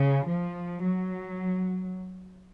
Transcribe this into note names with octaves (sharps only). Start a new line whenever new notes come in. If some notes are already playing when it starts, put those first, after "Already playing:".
Already playing: C#3
F3
F#3